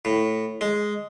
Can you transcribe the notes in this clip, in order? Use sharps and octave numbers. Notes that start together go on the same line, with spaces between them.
A2
G#3